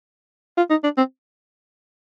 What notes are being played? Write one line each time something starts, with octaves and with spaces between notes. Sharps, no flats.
F4
D#4
D4
C4